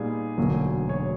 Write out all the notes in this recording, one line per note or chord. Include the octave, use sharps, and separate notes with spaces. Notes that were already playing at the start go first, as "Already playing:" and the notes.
Already playing: A#2 G3 B3 D#4 G#4
E1 D2 D3 F#3 A#3
C#5